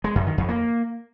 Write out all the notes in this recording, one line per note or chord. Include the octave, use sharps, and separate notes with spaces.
G#3
F#2
D#3
F2
A#3